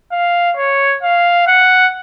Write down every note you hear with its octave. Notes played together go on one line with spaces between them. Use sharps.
F5
C#5
F5
F#5